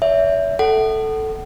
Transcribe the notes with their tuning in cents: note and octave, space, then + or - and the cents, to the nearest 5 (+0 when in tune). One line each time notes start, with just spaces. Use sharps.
C#5 +45 E5 +0
A4 +0 F#5 +30